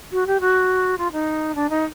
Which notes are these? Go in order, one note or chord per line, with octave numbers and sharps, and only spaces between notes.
F#4
G4
F#4
F4
D#4
D4
D#4